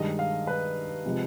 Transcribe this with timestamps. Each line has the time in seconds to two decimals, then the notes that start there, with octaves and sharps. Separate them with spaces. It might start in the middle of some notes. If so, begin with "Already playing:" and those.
Already playing: G2 D#3 G#3 D#5
0.19 F5
0.47 B4
1.06 C3 F3 G#3